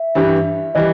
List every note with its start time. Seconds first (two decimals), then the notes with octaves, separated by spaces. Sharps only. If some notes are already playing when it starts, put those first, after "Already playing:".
Already playing: E5
0.15 G2 E3 G3
0.75 E3 G3 D#5